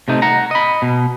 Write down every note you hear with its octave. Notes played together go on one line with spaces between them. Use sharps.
C3 A3 D#4
F#5 A#5
D#5 B5
B2